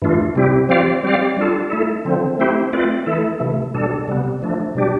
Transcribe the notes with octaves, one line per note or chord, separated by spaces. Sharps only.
G2 E3 A3 D4 F4
C3 G3 C4 E4 G4
F3 C4 G4 D5 F5
G3 C4 G4 D5 F5
G3 D4 F4 A4
A3 E4 A4
D3 F3 C4
A3 C4 E4 G4 C5
A3 C4 F4 B4 D5
E3 A3 E4 A4
C3 E3 A3
B2 G3 D4 A4
C3 G3 B3
F3 A3 D4
B2 G3 D4 G4